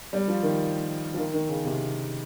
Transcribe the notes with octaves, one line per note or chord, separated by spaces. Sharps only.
G3
F3
D#3
F3
D#3
D#3
C#3
C3